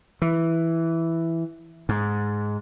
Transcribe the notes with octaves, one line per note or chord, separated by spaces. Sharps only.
E3
G#2